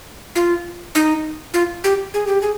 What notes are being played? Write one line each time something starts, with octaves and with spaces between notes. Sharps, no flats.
F4
D#4
F4
G4
G#4
G4
G#4